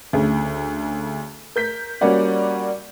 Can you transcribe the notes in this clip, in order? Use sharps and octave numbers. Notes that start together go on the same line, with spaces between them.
D2 C#3
A#4 G6 B6
G3 A#3 C#4 F#4 D5